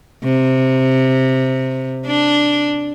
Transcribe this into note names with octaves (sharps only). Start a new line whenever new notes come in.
C3
D4